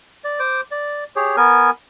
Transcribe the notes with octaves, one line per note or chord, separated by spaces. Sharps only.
D5
C5 D6
D5
G4 G#4 C#5
B3 A#4 G#5